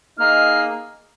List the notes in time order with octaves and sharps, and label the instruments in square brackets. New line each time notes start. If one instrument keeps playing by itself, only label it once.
[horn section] A#3 D#4 G#4 D#5 [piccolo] F6